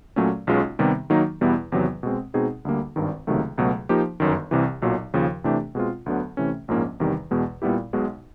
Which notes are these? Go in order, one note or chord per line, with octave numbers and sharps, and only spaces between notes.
A#2 F#3 A3 C#4
B1 B2 G#3 C#4 F4
C3 D#3 G3 B3
D#3 F#3 A#3 D#4
E2 B2 G3 B3 E4
E2 C3 D#3 F#3 B3
B2 G#3 C4
B2 G#3 C4 D#4 G#4
D2 D3 G3 A#3
G#1 G2 D#3
C#2 C3 D#3 F#3 A3
C#2 B2 F#3 A3
F3 A#3 D#4 G4 C5
G1 F#2 D#3
C2 C3 E3
B1 A#2 F#3
D#2 C#3 F3
C3 E3 A3 D4 G4
B2 G#3 C4 F4
D2 D3 F#3 B3
C3 E3 A3 C#4
A#1 G#2 F3 A#3 C#4
E2 C3 D#3 G3
E2 B2 G#3
A#2 G3 B3 E4 G4
B1 B2 G#3